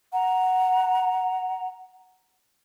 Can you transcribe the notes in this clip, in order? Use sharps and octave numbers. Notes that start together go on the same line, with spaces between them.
F#5 A#5